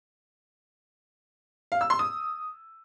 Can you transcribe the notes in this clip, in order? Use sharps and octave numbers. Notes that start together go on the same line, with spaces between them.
F5
E6
C6
D#6